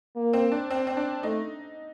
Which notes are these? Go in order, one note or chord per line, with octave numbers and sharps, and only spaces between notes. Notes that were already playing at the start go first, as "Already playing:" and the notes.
A#3
C4
D4
C4
C4
D4
A3 D#4